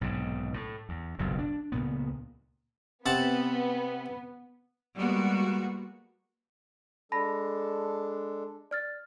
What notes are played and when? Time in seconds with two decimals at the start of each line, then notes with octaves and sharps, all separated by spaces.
0.01 B1 G#2 C3
0.54 A2
0.89 E2
1.19 F#1 B1 G2 C3
1.38 D4
1.72 C#2 A#2 B3
3.06 C3 B3 F#5 A5
4.96 G3 G#3 A#3 B3 F#4
7.12 G#3 D4 A4 A5 B5 A#6
8.71 D5 F6 A6